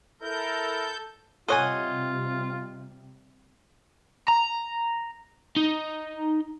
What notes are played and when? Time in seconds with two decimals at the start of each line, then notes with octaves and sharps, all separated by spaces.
0.21 E4 A4 A#4 G6
1.48 C3 G3 F4 A4 C#5 D#5 F#5 G#5
4.28 A#5
5.57 D#4